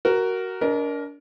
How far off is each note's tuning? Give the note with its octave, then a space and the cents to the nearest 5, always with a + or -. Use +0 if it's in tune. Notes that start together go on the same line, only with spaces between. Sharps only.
F#4 +15 A#4 +0
D4 -35 A#4 +15 D#5 +0